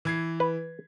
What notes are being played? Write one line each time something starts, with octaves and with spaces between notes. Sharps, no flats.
E3 G#6 C7
B4